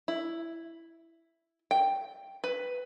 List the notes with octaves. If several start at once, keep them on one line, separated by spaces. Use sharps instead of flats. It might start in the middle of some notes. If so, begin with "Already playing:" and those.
E4
G5
B4